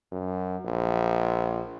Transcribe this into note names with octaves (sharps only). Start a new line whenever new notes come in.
F#2
A#1